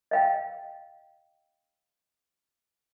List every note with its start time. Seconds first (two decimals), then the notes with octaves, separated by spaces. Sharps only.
0.11 D#5 F5 G5